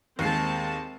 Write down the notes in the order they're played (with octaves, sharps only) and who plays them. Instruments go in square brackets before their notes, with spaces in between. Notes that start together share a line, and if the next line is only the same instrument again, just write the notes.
[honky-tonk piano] D#2 C7 [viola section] G#3 C4 A5